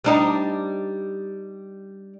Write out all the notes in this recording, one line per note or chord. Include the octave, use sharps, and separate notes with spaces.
G3 D4 D#4